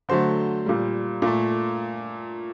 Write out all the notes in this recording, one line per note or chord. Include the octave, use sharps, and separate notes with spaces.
D3 F#3 A3 C5
A#2 G3
A#2 A3